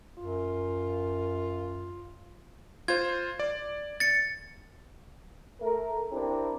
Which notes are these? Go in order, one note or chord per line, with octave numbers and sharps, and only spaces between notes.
F#2 F4
F4 C5 G#6
D5
A6 C#7
A3 A#4
C4 D4 E4 G4 A#4